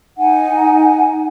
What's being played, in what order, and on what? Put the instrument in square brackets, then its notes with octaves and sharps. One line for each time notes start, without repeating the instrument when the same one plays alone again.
[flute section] D#4 F#5 G#5